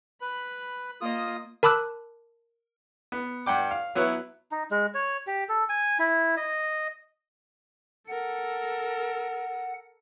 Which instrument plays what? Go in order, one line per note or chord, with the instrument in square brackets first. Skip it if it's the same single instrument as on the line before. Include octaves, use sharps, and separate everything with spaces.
[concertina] B4 [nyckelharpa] B5
[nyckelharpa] A#3 D#5 [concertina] F4 D#6
[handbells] A#4 A5 B5 D6 E6 F#6
[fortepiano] B3
G2 F#5 G5 D6
F5
F#3 B3 E4 B4 C#5
[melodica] D#4
G#3
C#5
G4
A4
G#5
E4
D#5
[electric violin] A4 A#4 [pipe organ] F#5